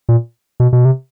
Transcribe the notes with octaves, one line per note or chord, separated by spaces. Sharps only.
A#2
B2
B2
C3